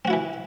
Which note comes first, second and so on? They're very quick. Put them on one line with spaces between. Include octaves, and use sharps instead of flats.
C4 F#4 E4 E3